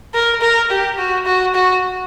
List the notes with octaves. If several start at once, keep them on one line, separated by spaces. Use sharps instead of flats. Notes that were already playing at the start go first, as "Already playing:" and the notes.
A#4
A#4
G4
F#4
F#4
F#4